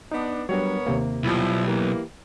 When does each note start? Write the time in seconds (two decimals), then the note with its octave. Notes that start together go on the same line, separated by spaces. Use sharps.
0.12 B3 D4 D#4
0.49 F#3 G3 B3 D4 A#4 C#5
0.87 D#2 C3 A#3
1.23 B1 F3 G3 E4
1.67 E3 A#3 G4